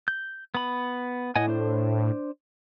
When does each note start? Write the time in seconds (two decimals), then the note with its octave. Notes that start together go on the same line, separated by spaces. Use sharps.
0.08 G6
0.55 B3 B5
1.36 A2 D#5 F#5 G#5
1.48 D4 C5